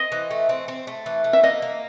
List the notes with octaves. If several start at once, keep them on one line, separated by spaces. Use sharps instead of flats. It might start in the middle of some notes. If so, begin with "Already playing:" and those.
Already playing: C4 D#5
E3
A3
C4
C4
A3
E3
A3
E5
A#3 D#5
A#3